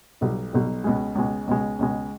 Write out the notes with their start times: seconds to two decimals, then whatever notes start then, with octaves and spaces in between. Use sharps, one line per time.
0.21 B1 B2 G3
0.52 B1 B2 G3
0.84 C#2 B2 G#3
1.15 C#2 B2 G#3
1.47 C#2 B2 G#3
1.79 C#2 B2 G#3